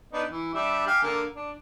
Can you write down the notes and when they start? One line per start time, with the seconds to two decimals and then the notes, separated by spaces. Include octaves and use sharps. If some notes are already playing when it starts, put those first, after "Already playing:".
0.13 B3 D4 D#4
0.30 E3
0.54 G3 D4 E5
0.87 G4 F5 G#5
1.03 D3 A#3
1.35 D4